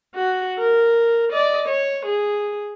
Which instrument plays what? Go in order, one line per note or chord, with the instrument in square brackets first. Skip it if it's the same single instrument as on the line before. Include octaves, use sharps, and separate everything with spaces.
[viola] F#4
A#4
D5 D#5
C#5
G#4